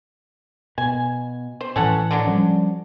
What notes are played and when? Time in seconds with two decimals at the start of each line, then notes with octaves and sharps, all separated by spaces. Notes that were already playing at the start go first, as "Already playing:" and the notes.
0.78 B2 G#5
1.61 C5
1.76 A2 E3 C#4 A4 F#5
2.11 D3 F#3 D4
2.27 F3 G3 C#4